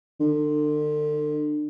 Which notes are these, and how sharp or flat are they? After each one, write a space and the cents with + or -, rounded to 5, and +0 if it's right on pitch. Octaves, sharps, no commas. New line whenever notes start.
D3 +35